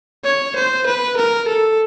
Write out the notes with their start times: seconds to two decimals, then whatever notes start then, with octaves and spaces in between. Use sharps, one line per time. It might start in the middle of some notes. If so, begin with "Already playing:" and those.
0.25 C#5
0.56 C5
0.86 B4
1.17 A#4
1.48 A4